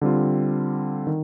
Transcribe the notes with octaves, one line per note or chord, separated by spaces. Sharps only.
D3 G3 C4 F4
D#3